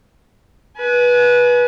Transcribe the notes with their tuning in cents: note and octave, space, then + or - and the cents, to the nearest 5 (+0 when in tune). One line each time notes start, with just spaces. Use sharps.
B4 -20 G#5 +35